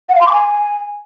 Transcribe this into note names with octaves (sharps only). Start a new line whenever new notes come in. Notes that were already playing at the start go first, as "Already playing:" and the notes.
F#5
F5
C6
D6
G#5